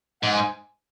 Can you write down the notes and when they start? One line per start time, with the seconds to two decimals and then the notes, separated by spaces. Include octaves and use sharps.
0.22 G#2 F#5
0.33 G#5